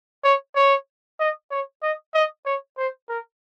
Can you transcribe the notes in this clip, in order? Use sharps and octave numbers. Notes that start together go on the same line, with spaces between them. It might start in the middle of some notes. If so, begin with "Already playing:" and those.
C#5
C#5
D#5
C#5
D#5
D#5
C#5
C5
A#4